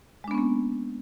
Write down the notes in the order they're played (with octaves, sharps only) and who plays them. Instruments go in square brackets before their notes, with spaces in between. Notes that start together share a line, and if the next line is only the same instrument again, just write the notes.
[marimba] G#3
D4
B3
C#4
A#3